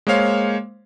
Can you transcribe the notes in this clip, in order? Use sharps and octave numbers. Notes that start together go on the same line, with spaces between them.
G#3 A#3 C5 C#5 F5